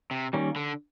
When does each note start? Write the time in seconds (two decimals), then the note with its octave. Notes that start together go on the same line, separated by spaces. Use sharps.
0.11 C3
0.33 D#3 G3 A#3 C#4
0.56 D3